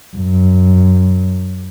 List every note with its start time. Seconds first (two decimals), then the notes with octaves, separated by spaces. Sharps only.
0.16 F#2